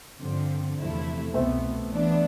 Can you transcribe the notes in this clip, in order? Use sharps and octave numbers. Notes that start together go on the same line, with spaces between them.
G2 D3 F3 C4
E2 C3 F3 A3 E4
C2 B2 A3 B3 C4
E3 B3 D4